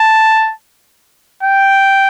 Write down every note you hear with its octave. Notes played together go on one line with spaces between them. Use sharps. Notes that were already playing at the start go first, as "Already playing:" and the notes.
Already playing: A5
G5